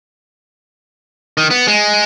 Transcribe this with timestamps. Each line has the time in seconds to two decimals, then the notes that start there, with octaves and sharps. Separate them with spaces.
1.37 D#3
1.50 B3
1.67 G#3